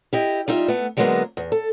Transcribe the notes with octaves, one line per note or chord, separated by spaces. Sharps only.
E4 G4 D#5
G3 D#4 F4 E5
A3 B3
D3 F#3 G#3 A#3 B3 D4
E2
A4